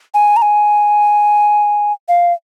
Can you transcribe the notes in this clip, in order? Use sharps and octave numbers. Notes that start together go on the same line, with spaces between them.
G#5
A#5
G#5
F5